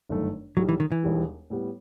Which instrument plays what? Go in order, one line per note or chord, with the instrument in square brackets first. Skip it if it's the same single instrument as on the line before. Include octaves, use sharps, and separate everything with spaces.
[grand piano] G1 F#2 D#3 A3
[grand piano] B1 A2 G3 [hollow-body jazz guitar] F#3
[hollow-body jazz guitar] E3
D#3
E3
[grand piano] E1 D#2 D#3 G3
A2 G3 B3